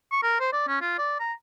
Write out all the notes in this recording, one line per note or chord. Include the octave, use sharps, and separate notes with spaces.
C#6
A#4
C5
D5
C#4
F4
D5
A#5